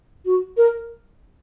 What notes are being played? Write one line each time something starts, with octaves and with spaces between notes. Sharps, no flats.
F#4
A#4